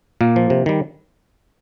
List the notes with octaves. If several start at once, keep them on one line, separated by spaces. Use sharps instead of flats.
A#2 A#3
F3
C3
D#3 G3